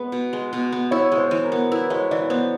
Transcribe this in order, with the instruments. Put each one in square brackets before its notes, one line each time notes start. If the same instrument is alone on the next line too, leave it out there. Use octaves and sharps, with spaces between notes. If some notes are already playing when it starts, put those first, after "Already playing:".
Already playing: [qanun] G#3 B3 [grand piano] B4
[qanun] B2
G#3
B2
B3
[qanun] E4 [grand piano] C#5
[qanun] G#3
[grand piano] C5
[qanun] E3
[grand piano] A#4
[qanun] B3
[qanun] E4 [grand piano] B4
[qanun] G#3 [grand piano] C#5
[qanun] E3 [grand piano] D5
[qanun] B3 [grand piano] C5